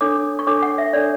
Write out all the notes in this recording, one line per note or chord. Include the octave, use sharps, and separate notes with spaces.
D4 A4 C#5 D6
C#6
D4 A4 C#5 D6
F#5
E5
D4 A4 C#5 D5